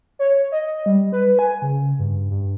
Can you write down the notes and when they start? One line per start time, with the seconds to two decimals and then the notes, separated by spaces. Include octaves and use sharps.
0.19 C#5
0.52 D#5
0.86 G3
1.12 B4
1.39 G#5
1.62 C#3
1.99 G2
2.31 G2